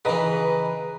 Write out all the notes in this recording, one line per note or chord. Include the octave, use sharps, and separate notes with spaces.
C#3 E3 B4 D#5 A#5